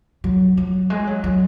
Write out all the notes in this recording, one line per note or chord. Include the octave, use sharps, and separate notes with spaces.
F#3
F#3
G#3
F#3
F#3